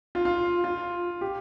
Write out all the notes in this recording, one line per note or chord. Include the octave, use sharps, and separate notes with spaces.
F4
F4
F4
G4